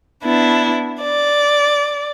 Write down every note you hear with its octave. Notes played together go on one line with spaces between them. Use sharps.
B3 D4 E4
D5